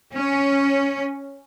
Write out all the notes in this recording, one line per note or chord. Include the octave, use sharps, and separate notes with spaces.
C#4